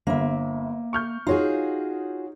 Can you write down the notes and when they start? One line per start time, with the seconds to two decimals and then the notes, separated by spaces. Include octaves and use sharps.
0.07 G1 A#3 E5
0.93 C#6 F6 G6
1.27 D#4 F4 F#4 G#4 C#5